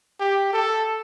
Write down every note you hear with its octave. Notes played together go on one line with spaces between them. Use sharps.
G4
A4